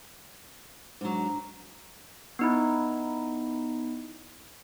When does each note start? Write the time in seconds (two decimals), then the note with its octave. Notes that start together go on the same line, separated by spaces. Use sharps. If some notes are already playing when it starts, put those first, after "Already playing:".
1.01 G#2 F#3 D4 A#5
2.39 B3 D#4 E4